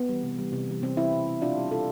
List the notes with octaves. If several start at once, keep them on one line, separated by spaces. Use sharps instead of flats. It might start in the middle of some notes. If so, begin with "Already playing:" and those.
Already playing: B3
E3 G3
C3
E3 G3
C3
E3 G3
C3 C4
E3 G3 C4 E4
B2
G3
B2 D4 F4
G3
B2 F4 A4